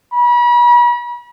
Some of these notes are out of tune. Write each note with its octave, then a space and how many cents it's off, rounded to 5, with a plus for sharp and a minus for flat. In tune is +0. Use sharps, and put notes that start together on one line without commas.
B5 -40